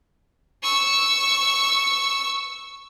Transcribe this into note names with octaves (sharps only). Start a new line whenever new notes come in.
C#6 E6